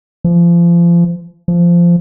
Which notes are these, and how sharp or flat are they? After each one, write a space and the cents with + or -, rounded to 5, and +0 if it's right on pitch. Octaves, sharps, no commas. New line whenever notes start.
F3 -30
F3 -15